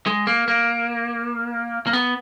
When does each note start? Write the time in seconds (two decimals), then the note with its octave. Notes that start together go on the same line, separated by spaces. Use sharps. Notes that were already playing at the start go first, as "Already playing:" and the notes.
0.07 G#3
0.27 A#3
0.48 A#3
1.87 A#3
1.93 B3